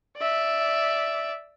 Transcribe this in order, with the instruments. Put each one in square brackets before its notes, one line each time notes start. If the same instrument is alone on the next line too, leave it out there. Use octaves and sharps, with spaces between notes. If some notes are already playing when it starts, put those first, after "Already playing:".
[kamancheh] D5 E5